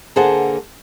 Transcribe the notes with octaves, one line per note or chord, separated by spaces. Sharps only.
D3 A#3 G#4 C5 F#5 A5